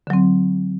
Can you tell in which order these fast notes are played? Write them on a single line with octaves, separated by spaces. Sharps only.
D3 F#3 C4